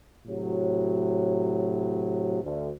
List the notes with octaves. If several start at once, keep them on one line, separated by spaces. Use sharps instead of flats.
A2 C3 F#3
D2